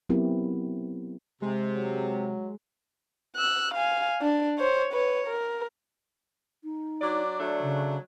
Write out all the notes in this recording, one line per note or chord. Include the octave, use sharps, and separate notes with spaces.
F#3 B3 C4 E4 G4 A#4
C3 G#3
F#3
E6 F#6
F5 G#5
D4
C5 C#5
B4 C#5
A#4
D#4
F#3 D4 D5
F#3 A3 D4 D5
C#3